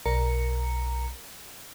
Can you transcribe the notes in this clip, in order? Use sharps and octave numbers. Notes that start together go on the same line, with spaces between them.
B1 A#4 A#5 C#7